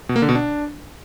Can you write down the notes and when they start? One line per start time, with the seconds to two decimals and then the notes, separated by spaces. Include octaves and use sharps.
0.09 B2
0.16 A#3
0.22 D3
0.29 B2
0.35 D4